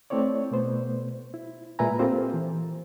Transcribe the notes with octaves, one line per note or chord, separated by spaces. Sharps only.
A3 C4 E4 C#5 D5
B2 A3 B3 C5
E4
A#2 G#3 B4 E5 G#5 A#5
A#3 C4 F4 G4 A4 C5
E3